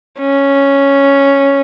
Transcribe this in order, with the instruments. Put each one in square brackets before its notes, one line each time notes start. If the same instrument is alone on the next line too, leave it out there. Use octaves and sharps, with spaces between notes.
[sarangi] C#4